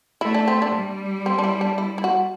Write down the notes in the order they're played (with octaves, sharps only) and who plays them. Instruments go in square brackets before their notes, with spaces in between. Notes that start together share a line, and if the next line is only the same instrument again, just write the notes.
[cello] A3 [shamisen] E4
[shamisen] D4
C4
D4
[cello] G3
[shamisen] C4
D4
E4
D4
E4
E4
F#4